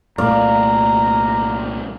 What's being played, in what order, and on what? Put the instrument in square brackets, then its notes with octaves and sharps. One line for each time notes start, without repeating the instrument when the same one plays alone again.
[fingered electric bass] C2 A#2 A3 [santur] A#3 D5 F5 [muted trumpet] A#5